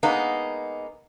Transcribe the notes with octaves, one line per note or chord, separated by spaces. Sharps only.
G#3 A#3 B3 D#4